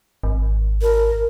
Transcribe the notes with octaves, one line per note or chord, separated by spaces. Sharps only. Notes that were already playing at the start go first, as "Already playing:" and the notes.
G#1
A#4